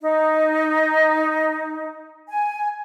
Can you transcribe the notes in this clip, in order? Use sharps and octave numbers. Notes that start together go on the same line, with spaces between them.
D#4
G#5